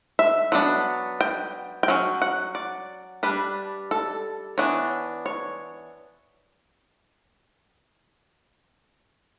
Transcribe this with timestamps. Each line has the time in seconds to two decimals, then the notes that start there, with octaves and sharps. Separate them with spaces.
0.19 E5
0.52 F#3 B3 D4
1.21 G5
1.83 G5
1.88 F#3 C#4
2.22 F#5
2.55 D5
3.23 G3 D4 B4
3.91 A4
4.58 E3 B3 D4 C#5
5.26 C#5